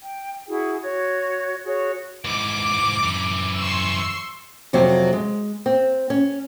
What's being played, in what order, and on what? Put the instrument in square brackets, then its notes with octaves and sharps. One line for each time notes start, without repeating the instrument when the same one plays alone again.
[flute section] G5
E4 F#4 G#4
F#4 C#5 G#6
F#4 G#4 C#5
[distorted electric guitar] G#2 E3 [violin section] D6 D7
[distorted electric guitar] F#2 E3
[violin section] C6 C#6 E6
[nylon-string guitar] F2 C3 F#3 C4
G#3
C4
C#4